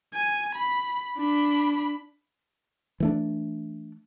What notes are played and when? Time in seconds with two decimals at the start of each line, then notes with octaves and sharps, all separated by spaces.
0.14 G#5
0.55 B5
1.18 D4 B5
3.00 E3 A3 D4